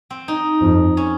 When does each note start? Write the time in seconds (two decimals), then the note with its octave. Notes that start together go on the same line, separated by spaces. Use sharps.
0.10 C4
0.28 D#4
0.62 F2
0.97 C#4